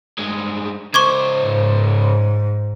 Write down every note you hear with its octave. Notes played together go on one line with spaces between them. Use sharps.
G2 G#3
C#2 C5 C#6 D6 G#6
G#2